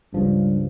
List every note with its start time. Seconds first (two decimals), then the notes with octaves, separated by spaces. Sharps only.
0.14 C#2 G2 C#3 F3